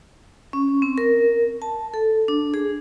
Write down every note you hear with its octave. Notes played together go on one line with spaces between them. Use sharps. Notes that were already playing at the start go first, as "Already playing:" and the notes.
C#4
C4
A#4
A5
A4
D4
G#4